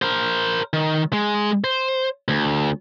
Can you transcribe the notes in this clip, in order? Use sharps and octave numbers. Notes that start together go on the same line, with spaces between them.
A#4 C5
D#3
G#3
C5
D2